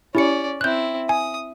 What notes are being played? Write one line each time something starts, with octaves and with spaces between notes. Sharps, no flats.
C#4 E4 G4 D5 C#7
C4 E4 F#6 G6
G#5 D#6